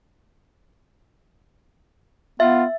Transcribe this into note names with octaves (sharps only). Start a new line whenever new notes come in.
B3 F4 E5